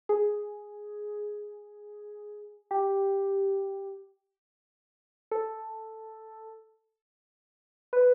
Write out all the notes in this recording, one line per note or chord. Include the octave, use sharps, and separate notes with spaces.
G#4
G4
A4
B4